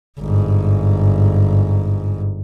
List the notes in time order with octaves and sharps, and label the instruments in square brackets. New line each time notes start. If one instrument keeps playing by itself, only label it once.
[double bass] G1 G#2